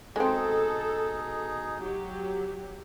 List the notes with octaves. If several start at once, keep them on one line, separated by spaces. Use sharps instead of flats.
B2 G#3 C4 D#4 G#4 A4
F#3 G4